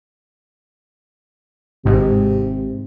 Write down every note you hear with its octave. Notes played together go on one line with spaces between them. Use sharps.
G#1 G#2 C3